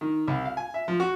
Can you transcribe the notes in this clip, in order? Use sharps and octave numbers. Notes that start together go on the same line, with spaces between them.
D#3
C2
F5
G#5
E5
F3
F#4